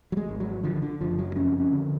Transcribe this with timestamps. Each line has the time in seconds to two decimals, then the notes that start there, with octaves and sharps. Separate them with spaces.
0.12 F#3
0.17 G#3
0.29 G#1
0.40 F#3
0.63 D3 F3
0.76 F3
0.82 D3
1.00 F#1 F3
1.19 F#3
1.36 F2 C#4
1.60 C#4
1.72 D3